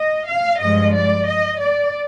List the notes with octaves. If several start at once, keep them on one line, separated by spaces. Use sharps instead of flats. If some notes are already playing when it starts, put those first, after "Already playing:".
Already playing: D#5
F5
G2 F3 G#3 D#5
D5
D#5
D5